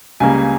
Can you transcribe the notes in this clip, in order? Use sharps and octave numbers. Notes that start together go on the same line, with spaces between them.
C#2 C#3 G3 A#3 G#5